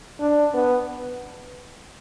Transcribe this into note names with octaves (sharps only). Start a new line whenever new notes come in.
D4
B3